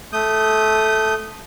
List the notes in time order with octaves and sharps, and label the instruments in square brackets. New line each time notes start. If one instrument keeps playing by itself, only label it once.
[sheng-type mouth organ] A3 D#6 G6